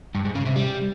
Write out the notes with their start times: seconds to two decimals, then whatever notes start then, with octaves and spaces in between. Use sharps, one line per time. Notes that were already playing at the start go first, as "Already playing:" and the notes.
0.15 G2
0.25 G#2
0.36 C#3
0.46 C3
0.56 G3